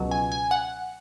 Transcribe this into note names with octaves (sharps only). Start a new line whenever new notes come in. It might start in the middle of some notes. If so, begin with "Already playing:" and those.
Already playing: C#2 B2 F#3
G#5
G#5
F#5